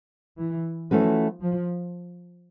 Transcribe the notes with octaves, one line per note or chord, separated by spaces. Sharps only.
E3
E3 F3 A3 C#4 F#4 B4
F3